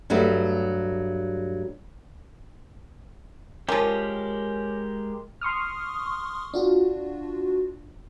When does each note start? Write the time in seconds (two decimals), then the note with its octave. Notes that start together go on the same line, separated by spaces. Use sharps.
0.10 G2 F#3 G3 A3
3.69 F3 G#3 C#4 G4 A#4
5.41 C6 C#6 D#6 F6
6.54 D4 F4 F#4